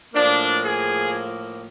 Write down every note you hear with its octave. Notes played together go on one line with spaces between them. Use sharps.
A2 F3 A#3 D4
G#4